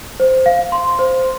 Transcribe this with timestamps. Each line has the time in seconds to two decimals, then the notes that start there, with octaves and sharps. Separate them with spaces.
0.20 C5
0.46 F5
0.72 C6
0.99 C5